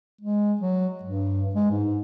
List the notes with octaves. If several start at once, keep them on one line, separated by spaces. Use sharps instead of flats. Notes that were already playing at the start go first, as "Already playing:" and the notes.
G#3
F#3
G2
G#3
G#2